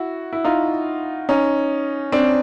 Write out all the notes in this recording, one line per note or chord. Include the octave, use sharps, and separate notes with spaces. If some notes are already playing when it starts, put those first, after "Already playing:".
Already playing: E4 F#4
E4
D#4 F4
C#4 D#4
C4 D4